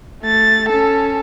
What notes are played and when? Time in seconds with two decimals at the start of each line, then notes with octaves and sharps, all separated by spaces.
0.23 A3 A6
0.69 C#4 A4